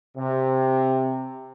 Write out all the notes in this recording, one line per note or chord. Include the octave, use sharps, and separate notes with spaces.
C3